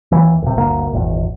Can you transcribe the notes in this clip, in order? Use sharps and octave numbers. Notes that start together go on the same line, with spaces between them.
D#2 E3
D#1 C3
G1 D2 A#3
D#1 G#1 E2